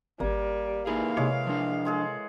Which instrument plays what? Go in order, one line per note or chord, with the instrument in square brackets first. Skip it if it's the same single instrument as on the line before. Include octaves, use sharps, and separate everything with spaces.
[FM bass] G#1 [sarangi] G3 [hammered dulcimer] A#3
[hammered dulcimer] E3 [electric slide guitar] A#3 D#4 G#4 [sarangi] F5
[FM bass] C3 [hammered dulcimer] G#3 C#5 D6
[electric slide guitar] F3 D4
[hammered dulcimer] G#3 G#4 A4